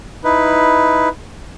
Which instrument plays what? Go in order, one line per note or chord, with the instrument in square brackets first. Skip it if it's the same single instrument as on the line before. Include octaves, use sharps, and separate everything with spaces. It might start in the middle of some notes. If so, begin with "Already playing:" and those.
[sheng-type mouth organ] D#4 E4 B4